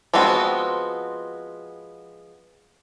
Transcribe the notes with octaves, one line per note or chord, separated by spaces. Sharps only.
F3 G#3 B3 C4 F#4